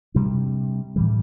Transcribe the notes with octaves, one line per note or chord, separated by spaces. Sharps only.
C3 G3 D4
A2 E3 G3